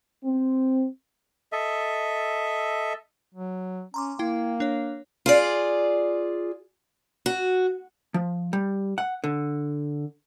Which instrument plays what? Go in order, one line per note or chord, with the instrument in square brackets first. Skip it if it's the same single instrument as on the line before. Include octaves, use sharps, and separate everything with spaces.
[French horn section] C4
[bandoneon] A4 D#5 E5
[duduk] F#3
[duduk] C#4 [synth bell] A#5 C6 D6
[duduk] A#3 [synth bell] E4 G5
[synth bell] D4 C#5
[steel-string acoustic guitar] F4 G#4 D5
F#4
[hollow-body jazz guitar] F3
G3
F#5
D3